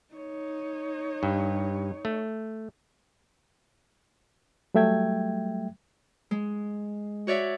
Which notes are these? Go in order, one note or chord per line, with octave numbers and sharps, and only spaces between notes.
D#4 C#5
G2
A3
F#3 G3 A3 E5 G5 G#6
G#3
F#4 C#5 D5 E5